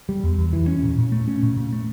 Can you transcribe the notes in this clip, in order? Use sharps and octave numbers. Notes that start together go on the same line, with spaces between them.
G3
E2
E2
E3
C#4
A#2
A#2
A3
C#4
A#2
A#2
A3